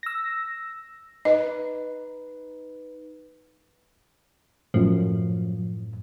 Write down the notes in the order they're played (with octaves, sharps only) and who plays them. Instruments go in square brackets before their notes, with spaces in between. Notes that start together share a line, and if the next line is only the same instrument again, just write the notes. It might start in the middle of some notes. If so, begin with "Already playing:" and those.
[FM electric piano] E6 A#6
[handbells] D#4 B4 [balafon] D#5
[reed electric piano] F#2 A2 [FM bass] F3